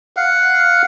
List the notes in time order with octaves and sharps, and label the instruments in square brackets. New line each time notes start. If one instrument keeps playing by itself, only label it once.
[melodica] F5 F#5